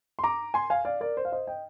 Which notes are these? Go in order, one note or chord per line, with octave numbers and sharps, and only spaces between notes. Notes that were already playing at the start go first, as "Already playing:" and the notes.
C6
A#5 D6
G#5 C6
F5 G#5
D5 F5
A#4 D5
C5
F5
C5 D#5
D#5 G5